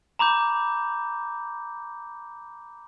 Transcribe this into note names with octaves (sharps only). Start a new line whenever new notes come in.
A#5 B5 D6 G6